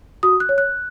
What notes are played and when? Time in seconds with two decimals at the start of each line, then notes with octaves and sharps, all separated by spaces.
0.23 F#4 D#6
0.40 F#6
0.49 C#5
0.58 F#6